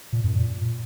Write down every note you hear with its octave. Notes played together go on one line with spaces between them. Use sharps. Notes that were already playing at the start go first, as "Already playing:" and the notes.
A#2
F#2
A#2